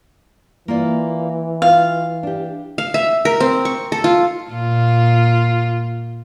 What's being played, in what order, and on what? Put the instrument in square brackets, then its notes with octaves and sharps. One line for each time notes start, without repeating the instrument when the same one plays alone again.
[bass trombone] E3 [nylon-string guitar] A#3 F4 D5
[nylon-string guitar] F4 [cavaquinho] F5
[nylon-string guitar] D4 G4
[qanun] F5
E5
A#4
C4
C#6
A4
F4
[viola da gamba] A#2 F4